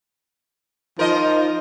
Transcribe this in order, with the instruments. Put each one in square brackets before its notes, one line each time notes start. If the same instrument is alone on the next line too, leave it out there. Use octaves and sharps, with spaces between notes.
[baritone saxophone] F3 [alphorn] D#4 [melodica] F4 C5 [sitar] A#4 D#5